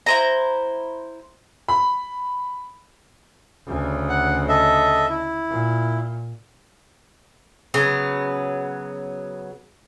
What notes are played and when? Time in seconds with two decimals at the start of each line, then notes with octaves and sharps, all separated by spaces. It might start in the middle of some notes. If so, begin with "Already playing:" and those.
0.06 E4 C5 A#5
1.68 B5
3.67 D2 C#3
4.09 F#5
4.49 A4 D#5 E5
5.09 E4
5.49 A#2
7.74 C#3 F#3 B3